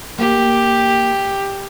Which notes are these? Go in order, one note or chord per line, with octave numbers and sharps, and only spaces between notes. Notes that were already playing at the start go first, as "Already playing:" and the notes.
A#3 G4